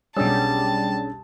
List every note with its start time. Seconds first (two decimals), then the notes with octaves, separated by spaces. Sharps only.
0.17 B1 G3 C#4 D4 G#4 A5 E6